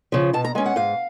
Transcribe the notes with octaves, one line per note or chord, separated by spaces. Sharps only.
C#3 F3
B2 A5
A#5
G#3 C#4 G#5
F#5
G#2 F5